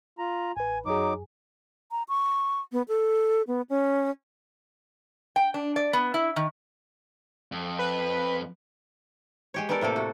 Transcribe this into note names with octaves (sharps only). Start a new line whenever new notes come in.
F4 A#5
A1 B4 G#5
F#2 F#3 D#4 G#4 D6
A#5
C#6
B3
A4
B3
C#4
G5
D4
D5
B3
E4
D#3
F2
B4
G#3 G4 C#5
B3 G4 A4 A#4 D5
A2 C3 A#3 A4
F#4